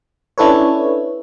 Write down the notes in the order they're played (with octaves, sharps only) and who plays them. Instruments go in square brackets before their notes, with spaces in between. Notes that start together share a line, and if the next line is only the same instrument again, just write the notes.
[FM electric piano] C#4 D4 E4 A4 B4 C#5